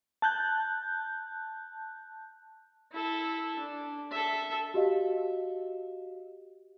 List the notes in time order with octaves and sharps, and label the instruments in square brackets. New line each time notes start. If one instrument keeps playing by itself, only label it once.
[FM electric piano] A5 F#6 G6
[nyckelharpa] E4 A4
D4
A4 E5
[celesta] F#4 G4 D#5 F5